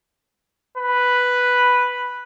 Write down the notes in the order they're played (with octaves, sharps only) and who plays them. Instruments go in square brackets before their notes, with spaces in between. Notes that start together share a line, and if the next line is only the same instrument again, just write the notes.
[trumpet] B4